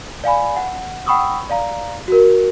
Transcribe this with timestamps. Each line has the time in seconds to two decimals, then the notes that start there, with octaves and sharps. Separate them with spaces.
0.24 D5 F5 G#5 B5
0.56 F#5
1.06 F#5 G5 B5 C#6 D#6 E6
1.49 D5 F5 A#5
2.08 F#4 A#4